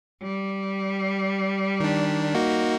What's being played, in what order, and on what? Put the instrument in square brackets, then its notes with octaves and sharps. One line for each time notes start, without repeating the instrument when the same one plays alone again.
[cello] G3
[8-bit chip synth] D#3 D4
A#3 D#4 F#4